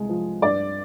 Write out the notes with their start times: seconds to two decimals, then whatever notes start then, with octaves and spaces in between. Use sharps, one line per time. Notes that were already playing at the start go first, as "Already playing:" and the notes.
Already playing: C2 G#3
0.09 F3
0.42 G2 D5